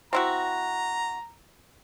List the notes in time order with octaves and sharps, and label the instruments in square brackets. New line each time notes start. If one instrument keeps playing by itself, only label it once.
[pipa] C4 E4 F#4 [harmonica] A#5